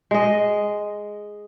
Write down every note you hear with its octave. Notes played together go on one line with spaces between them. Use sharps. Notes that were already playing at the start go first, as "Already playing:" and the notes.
G#3 D#5